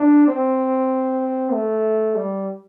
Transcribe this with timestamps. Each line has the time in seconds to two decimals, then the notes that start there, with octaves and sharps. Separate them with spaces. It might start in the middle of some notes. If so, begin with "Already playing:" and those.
Already playing: D4
0.28 C4
1.52 A3
2.15 G3